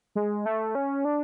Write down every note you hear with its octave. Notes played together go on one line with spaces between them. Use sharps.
G#3
A3
C#4
D4